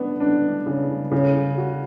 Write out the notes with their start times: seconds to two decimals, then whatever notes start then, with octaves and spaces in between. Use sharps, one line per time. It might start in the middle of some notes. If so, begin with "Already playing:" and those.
Already playing: B3 D4
0.20 D4
0.66 C#3
1.12 C#3
1.57 F#4